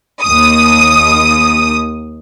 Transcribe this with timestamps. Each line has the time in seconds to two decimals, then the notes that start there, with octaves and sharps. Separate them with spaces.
0.23 D#2 D#6